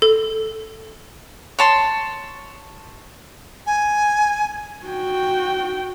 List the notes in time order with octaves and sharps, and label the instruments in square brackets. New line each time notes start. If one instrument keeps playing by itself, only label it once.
[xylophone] A4
[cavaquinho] C#5 A5 C6
[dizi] G#5
[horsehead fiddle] F#4 G5